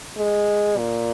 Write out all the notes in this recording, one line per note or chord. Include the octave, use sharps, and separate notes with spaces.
G#3
A#2